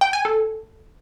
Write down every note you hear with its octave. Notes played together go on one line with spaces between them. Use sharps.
G5
G#5
A4